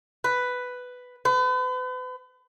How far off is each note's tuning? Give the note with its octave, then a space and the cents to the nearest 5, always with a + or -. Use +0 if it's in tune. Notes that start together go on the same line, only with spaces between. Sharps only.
B4 +5
B4 +40